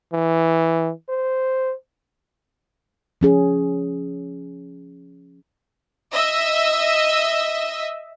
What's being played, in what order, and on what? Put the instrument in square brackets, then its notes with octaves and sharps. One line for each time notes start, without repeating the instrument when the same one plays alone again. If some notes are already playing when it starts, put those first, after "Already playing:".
[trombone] E3
C5
[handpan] F3 C#4 G#4
[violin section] D#5 E5